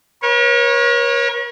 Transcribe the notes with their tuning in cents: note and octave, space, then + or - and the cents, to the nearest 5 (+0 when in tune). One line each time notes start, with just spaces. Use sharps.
A#4 +45 C#5 -20